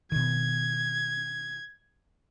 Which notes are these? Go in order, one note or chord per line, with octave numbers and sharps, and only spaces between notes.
B2 D#3 G#6